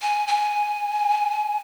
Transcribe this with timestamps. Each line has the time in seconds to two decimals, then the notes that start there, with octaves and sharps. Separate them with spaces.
0.02 G#5
0.27 G#5